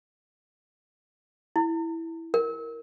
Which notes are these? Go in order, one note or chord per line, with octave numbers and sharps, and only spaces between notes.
E4
A#4